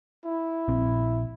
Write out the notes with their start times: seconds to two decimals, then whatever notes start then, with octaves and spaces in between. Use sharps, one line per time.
0.25 E4
0.68 A#1 C4